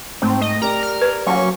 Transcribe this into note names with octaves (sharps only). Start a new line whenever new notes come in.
G#2 A3 C4
D#5
G4 A#4 D5 A#5
F6
B4
F#3 A#3 C#4 C#6